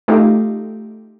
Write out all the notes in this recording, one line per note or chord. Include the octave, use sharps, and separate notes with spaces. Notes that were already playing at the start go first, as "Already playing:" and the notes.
A3 D#4 F4 G4